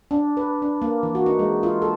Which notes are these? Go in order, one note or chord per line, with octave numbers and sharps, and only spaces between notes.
D4
B4
D4
A#3
E3
F#4
D#4
G#3
F4
A4